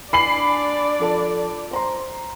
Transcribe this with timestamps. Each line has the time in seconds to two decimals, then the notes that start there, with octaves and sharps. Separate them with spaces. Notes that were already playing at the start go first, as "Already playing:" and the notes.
0.13 D4 D5 G#5 B5 C7 F#7
0.99 F3 A4 A5
1.71 C5 A#5 C6